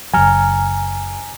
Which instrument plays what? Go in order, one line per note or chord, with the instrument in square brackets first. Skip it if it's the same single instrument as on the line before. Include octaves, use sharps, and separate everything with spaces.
[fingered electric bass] F#1 F#3 [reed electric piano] G#5 A#5 F6